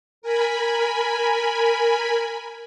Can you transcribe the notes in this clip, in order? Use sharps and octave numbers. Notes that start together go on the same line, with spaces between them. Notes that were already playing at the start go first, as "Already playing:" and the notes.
A#4 G#5 B5